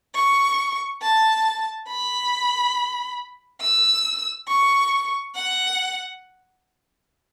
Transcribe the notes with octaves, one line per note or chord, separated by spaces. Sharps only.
C#6
A5
B5
E6
C#6
F#5